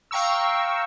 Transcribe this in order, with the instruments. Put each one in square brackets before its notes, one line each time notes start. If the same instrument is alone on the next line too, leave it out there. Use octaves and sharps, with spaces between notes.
[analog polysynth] F5 G5 A#5 C#6 E6